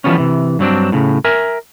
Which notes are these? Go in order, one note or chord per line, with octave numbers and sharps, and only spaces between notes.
E3 F3 G3 B3 C#4
C3 E3
G2 F#3 C4 D4
A2 C#3
A#4 E5 G#5